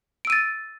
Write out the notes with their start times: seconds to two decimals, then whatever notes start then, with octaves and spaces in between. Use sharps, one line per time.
0.25 D7
0.27 E6
0.30 D#7
0.32 A6